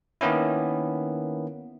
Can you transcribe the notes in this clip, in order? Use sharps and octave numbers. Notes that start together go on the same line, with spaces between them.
D#3 A#3 B3 C#4 E4